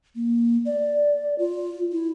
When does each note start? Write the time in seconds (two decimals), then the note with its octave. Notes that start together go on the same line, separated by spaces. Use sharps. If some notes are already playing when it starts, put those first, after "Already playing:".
0.16 A#3
0.66 D5
1.39 F4
1.92 E4